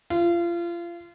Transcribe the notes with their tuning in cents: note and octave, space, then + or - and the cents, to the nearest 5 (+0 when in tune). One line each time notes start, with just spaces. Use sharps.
F4 -30